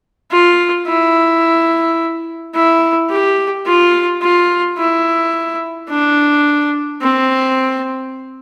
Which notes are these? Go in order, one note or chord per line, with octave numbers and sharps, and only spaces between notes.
F4
E4
E4
G4
F4
F4
E4
D4
C4